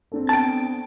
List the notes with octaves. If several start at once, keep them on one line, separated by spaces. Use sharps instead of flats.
C4 D4 A4
B3 G5 A5